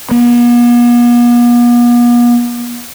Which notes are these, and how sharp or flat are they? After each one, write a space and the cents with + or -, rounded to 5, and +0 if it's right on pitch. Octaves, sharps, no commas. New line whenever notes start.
B3 -45